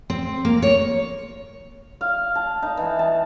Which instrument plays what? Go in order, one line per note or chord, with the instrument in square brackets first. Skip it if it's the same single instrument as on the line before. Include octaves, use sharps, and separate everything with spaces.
[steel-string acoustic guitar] C4
A#3
C#5
[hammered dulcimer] F5
A5
D#4
E3
A5